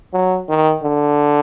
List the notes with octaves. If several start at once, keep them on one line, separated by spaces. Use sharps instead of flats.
F#3
D#3
D3